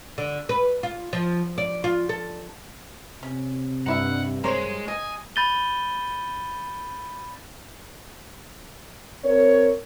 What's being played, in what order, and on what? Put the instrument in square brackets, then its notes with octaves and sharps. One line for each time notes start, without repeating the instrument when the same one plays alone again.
[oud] D3
B4
F4
F3
D5
F4
A4
[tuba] C3 [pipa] C#4
[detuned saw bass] G2 [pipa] D#4 E4 E5 [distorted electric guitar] F#5
[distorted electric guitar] G#3 [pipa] A#4 C5 C#5
[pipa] D#5 [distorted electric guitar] G#5
[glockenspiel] B5 G6 A6 D#7 G7
[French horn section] C4 A#4 C#5